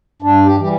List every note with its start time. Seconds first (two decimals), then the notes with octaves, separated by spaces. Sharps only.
0.22 G2 D4
0.46 G4
0.57 E3 G3 G4